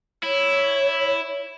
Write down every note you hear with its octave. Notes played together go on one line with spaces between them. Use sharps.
E4 C#5